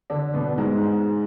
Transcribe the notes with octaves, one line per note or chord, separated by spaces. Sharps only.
D3 D4
B2 B3
G#2 G#3